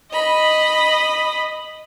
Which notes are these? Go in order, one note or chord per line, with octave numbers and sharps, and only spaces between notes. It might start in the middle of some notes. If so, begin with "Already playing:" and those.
D#5 B5